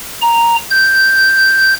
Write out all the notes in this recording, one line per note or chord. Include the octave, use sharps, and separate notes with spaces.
A#5
G6